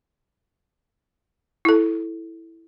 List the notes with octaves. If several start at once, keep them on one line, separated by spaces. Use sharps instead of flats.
E4 A4